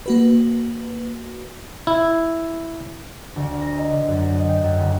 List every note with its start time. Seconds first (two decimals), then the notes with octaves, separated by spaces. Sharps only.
0.06 A#3 F#4 B4
1.87 E4
3.36 D2
3.61 A#5
3.74 D#5
3.92 D3
4.08 F#2
4.21 F#4
4.34 D#5
4.49 G5
4.63 F#2
4.79 D2